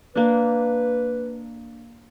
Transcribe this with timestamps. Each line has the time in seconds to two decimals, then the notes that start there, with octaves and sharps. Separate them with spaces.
0.15 A#3 D4 B4